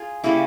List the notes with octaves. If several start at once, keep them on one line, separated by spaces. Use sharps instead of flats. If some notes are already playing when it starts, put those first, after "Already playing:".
Already playing: F4 G#4
C#3 G3 A#3 E4